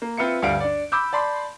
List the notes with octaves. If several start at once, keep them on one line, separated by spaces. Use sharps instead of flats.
A#3
C4 F4 B4 E5 C#7
D2 G2 G3 F5 D7
D4 D5
B5 D6 E6 G6
D5 A5 B5 C6